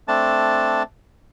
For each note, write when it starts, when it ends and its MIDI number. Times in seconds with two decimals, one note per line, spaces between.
0.08 0.83 57
0.08 0.83 60
0.08 0.83 62
0.08 0.83 81